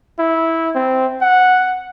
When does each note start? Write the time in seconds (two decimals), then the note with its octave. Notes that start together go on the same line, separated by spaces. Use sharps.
0.19 E4
0.75 C4
1.22 F#5